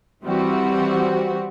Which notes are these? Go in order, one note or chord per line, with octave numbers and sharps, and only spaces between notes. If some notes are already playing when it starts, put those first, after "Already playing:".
E3 G3 C4 F#4